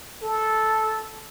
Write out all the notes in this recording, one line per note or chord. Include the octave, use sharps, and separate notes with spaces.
A4